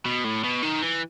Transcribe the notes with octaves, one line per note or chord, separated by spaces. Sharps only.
B2
A2
B2
D#3
E3